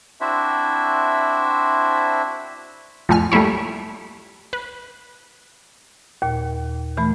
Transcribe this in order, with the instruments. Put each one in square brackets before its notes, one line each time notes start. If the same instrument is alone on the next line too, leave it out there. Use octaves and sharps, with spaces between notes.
[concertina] C4 D4 E4 F#4 C5 E5
[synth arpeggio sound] F2 A2 A3 G#5 F6
G3 A3 A#3 E4 C#5
B4
[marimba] D#2 A#2
A#2 E3 A3 B5